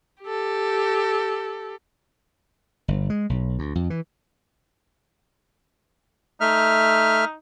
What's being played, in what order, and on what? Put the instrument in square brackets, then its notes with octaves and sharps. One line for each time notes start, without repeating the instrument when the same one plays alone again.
[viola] G4 A4
[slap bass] G1
G#3
B1
D2
F2
E3
[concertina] A3 E5 F6 [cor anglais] D#4